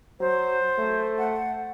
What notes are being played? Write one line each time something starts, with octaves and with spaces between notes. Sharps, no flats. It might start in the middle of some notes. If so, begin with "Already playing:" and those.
F#3 C5
A3
F#5